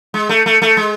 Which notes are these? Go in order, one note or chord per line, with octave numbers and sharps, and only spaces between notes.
G#3
A3
A3
A3
G#3